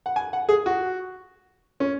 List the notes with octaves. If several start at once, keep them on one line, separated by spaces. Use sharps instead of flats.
F#5
G#5
F#5
G#4
F#4
C#4